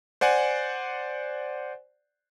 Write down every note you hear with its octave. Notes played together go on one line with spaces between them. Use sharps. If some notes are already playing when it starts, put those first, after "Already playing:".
C5 D5 F#5 G#5